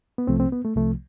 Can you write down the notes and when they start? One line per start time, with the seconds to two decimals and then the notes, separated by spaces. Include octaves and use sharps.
0.18 B3
0.27 C2 C3 F3 A3 C4
0.39 C4
0.52 B3
0.65 A3
0.76 C2 C3 F3 A3